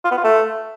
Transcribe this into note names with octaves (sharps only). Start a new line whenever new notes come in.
F4
B3
F4
A3